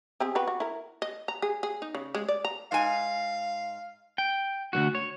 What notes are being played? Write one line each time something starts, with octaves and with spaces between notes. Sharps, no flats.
C4 G4 G#4
F#4 G4 B4
F#4
E4 A#4
D#5
A#5
G#4
G#4
D#4
C#3
G#3
D5
A#5
G#2 F5 G#5
G5
D2 G2 F#4
C#5